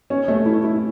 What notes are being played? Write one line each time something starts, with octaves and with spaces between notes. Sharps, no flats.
C#4
A3
E4
E4